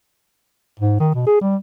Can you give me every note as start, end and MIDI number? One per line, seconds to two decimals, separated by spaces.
0.80 0.96 44
1.00 1.09 51
1.15 1.25 47
1.27 1.41 68
1.41 1.56 55